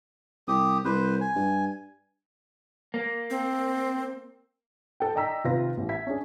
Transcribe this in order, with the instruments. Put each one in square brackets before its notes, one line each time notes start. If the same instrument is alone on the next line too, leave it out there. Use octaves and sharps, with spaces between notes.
[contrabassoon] C2 [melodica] G4 D#6
[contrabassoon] C2 [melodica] B4 C5
[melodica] G#5
[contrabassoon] G2
[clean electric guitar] A#3
[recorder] C4
[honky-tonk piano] A4 G5
D5 D#5 G5 A#5 E6 B6
C3 D#3 F4 B4 A#6
A1
E5 G#6 B6
C#4 D4 G#4